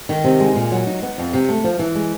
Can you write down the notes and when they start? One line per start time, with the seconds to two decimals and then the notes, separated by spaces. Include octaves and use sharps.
0.09 D#3
0.24 C3
0.40 G#3
0.56 A#2
0.72 F#3
0.87 D#4
1.02 B3
1.18 F2
1.33 C3
1.49 A3
1.64 F3
1.79 E3
1.95 G#3